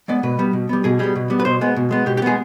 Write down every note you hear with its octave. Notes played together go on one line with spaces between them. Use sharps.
G#3 B3 D5
B2 B4
G3 B3
B2
G3 B3
B2 G#4
G3 B3 G#4
B2
G3 B3
B4
B2 C5
G#3 B3
B2
G#3 B3
B2 G4
G4
G#3 B3 G#4